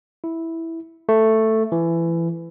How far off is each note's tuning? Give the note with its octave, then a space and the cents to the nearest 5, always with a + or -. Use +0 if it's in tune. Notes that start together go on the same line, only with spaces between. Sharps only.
E4 -5
A3 +5
E3 +20